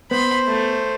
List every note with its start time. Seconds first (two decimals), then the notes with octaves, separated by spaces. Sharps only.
0.11 B3 C5 B5 C6
0.47 A3